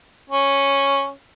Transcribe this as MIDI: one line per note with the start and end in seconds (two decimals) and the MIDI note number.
0.30 1.09 61